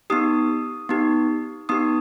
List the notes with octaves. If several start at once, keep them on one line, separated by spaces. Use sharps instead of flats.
B3 D#4 G4 D#6
B3 D#4 G4
B3 D#4 G4 D#6